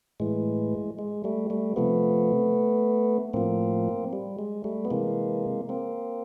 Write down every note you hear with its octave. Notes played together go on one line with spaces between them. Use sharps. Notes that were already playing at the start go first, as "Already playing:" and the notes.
A2 E3 G#3
G#3
G3 A3
G3 A3
C3 F3 A3 B3
A2 F3 A#3 C4
G3
G#3
G3 A3
B3
C3 E3 G#3 A#3
A#3 C4